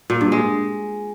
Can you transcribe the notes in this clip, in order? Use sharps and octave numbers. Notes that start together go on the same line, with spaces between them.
A#2
G2
G#3